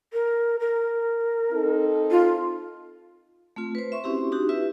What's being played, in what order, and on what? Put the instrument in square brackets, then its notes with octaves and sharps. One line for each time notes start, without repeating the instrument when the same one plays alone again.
[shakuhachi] A#4
A#4
[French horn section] C4 D#4 A4
[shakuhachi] F4
[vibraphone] A3 C4 F4
B4 C5
E5 C6 C#6
C4 C#4 E4 F#4 G4
D4 D#4 F#4 G4
E4 F4 G4 B4 E5